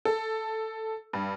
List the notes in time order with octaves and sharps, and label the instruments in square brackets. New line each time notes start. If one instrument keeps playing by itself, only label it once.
[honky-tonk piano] A4
G2